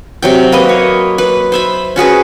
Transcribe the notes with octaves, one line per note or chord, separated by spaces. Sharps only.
C3 F#3 G5
A#3 B4 D#5
C#5
B4
C5 E5 B5
C#4 F#4 G#4 B4